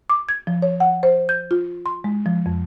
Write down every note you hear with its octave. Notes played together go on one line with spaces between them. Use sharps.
D6
G#6
F3
C#5
F#5
C5
G6
F4
C6
G#3
F3
F2